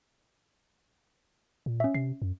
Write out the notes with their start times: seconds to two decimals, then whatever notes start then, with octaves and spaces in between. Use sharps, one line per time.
1.66 A#2
1.80 C#4 E5
1.95 C3 C7
2.22 F#2